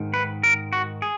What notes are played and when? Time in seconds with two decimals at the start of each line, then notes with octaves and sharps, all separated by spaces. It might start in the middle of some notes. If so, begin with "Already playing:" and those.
Already playing: G#2 D#3
0.14 B4
0.43 A#4
0.73 F#4
1.02 G#4